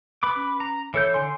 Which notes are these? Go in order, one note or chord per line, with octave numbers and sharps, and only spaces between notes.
B4 B5 D6
C#4
A#5
E3 A4 C#5 G6
D3 G#5 C6